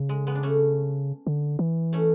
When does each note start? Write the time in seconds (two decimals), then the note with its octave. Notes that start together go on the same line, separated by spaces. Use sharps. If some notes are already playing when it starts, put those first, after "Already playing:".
Already playing: C#3
0.09 G#3
0.27 G#3 B3
0.35 D4
0.43 A3 C#4
1.27 D3
1.59 E3
1.93 A3 C#4